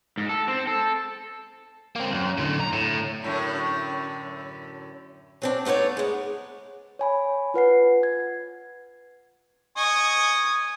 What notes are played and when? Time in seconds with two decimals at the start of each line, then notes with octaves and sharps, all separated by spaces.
0.18 G#2
0.29 A4
0.48 C4
0.67 A4
1.96 A#3 C4
2.10 C2 F#2
2.38 A2 D3
2.60 A#5
2.73 A2
3.22 F#2 A2 D3
5.42 F#3 C4 D4
5.65 A3 B3 D#4 C#5 D5
5.97 G#3 B3
6.99 C#5 G#5 B5
7.54 F4 B4 F#5 C7
8.03 G#6
9.77 D#5 G#5 C#6 D#6